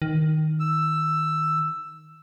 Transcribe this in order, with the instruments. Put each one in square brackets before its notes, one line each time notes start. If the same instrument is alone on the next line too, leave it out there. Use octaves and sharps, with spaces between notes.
[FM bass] D#3
[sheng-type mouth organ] E6